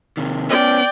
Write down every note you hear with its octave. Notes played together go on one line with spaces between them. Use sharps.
C3 D#3
B3 C#4 D5 G5